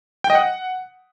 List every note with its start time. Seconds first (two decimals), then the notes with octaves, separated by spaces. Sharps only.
0.24 G5
0.30 D#5
0.35 F#5